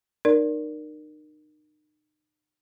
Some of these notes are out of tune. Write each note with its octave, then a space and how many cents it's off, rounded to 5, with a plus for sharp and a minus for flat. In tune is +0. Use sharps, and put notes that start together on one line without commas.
D#4 -35 A#4 +0 D5 -10